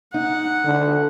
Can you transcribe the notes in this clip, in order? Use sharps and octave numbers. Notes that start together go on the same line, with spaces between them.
D#4 F#5
D3